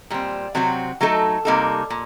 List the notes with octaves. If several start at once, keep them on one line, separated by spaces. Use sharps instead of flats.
A#2 G3 C4
C3 F#3 C4 F#4
F#3 A3 D#4 A4
C3 G3 A#3 D#4 A4
A#2